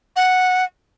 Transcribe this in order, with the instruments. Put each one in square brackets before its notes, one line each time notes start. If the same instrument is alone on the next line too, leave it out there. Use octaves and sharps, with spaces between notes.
[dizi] F#5